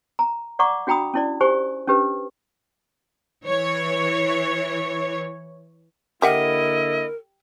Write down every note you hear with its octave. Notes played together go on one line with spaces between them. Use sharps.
A#5
D5 F#5 A#5 C#6 D6
D4 F#4 G5 A#5 B5 D#6
C#4 E4 D5
G4 C5 G#5 C#6
C#4 D4 G4 B4
E3 C#5
D3 A#3 E4 G4 A#4 D#5 E5 F#5